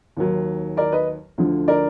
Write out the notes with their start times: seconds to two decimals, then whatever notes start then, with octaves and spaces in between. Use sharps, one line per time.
0.17 D#2 D#3 F#3
0.77 A#4 D5
0.92 B4 D#5
1.38 D2 D3 F3
1.68 A#4 D5